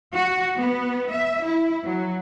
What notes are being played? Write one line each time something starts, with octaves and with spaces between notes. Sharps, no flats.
F#4
B3
E5
E4
F#3